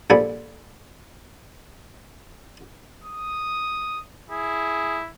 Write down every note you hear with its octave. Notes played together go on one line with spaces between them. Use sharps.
A#1 F3 G3 A4 G#5 B5
D#6
E4 G#4